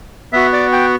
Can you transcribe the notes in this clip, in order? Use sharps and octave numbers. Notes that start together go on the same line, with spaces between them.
B3 F#4 E5
D5
G5